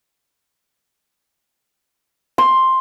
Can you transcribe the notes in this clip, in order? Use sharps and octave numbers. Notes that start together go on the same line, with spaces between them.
C6